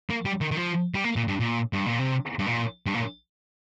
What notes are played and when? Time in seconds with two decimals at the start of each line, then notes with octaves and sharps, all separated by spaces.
0.10 A#3
0.25 G3
0.41 D#3
0.51 D#3
0.57 F3
0.95 G3
1.04 A#3
1.16 A#2
1.28 G2
1.40 A#2
1.73 G2
1.86 A#2
1.99 C3
2.39 G2
2.47 A#2
2.86 G2
2.94 A#2